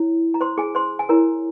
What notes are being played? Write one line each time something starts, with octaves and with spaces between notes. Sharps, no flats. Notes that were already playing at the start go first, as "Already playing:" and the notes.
Already playing: E4 C#5
A#5
C5 C6
G#4 G#5
C5 C6
G#5
E4 A#4 C#5 A#5